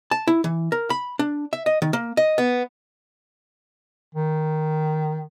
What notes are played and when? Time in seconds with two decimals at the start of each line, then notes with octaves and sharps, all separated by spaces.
0.11 A5
0.27 E4
0.44 E3
0.72 A#4
0.90 B5
1.19 D4
1.53 E5
1.66 D#5
1.82 D#3
1.93 A#3
2.17 D#5
2.38 B3
4.15 D#3